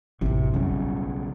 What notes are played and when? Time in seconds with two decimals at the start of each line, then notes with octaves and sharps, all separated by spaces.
0.21 A1 F#2 C3
0.54 B1 C#3 G3